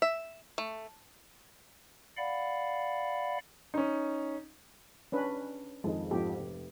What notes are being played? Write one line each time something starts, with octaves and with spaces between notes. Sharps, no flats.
E5
A3
D5 F5 F#5 B5
C#4 D#4
C#4 D4 B4
F2 D#3 G#3
F2 G#2 F3 G4
F1